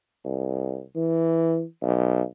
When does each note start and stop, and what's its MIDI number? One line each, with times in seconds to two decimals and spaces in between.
0.25 0.82 36
0.96 1.63 52
1.83 2.22 35